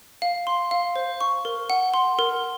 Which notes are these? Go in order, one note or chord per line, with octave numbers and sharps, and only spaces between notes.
F5
C6
F5
C5
C#6
A#4
F#5
C6
A#4